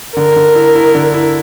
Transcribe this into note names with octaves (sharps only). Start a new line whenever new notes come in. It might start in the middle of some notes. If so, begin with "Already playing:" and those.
D3 A#4
D3
E4
E4
D3
E4